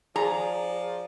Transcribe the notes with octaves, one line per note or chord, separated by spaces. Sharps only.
F3 G#4 D5 A#5